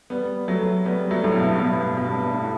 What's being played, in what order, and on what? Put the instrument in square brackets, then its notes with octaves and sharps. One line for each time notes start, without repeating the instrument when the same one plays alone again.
[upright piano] G3 B3
F#3 A3
G3 B3
F#3 A3
A2
G2 B2
G2 B2
G2 B2
A2